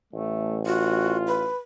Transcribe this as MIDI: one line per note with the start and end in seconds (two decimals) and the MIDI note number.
0.13 1.48 33
0.13 0.57 57
0.66 1.48 65
0.66 1.17 66
1.28 1.56 71